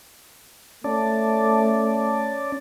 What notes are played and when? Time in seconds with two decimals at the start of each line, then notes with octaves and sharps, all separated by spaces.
0.84 A3 C#4 D5 A5